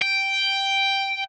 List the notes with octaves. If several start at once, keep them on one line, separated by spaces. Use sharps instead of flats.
G5